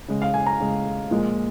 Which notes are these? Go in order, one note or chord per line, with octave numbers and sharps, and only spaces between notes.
C#3 G#3
F5
G#5
A#5
C#3 G#3
A#2 F3 G#3